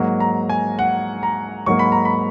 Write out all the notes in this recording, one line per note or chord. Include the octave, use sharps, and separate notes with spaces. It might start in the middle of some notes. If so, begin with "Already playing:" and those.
Already playing: G#2 F#3 A#3
A#5
G#5
F#5
A#5
G#2 F#3 A#3 C#6
B5
A#5
B5